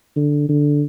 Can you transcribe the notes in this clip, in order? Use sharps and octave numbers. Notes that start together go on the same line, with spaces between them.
D3
D3